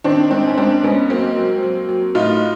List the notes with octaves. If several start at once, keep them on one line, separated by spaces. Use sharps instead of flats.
D#3 C4 D4
G#2 C4 D4
C#4
G#2 C4 D4
G#2 B3 C#4
F#3 A#3 C4
F#3
F#3
F#3
A2 D#4 F4